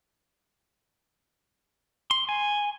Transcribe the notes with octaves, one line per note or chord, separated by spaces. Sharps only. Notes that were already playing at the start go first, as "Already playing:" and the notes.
C6
G#5